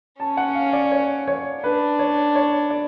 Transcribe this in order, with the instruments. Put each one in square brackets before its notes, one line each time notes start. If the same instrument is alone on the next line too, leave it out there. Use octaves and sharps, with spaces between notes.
[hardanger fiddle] C#4 [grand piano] A5
[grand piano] F#5
F5
D5
C#5
C#5
[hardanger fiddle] D4 [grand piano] B4
[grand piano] C#5
C#5
D5